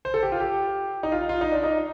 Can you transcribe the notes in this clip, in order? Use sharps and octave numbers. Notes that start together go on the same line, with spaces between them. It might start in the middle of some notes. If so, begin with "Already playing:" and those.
C5
A4
G4
F4
G4
D#4
F4
F4
D#4
D4
D#4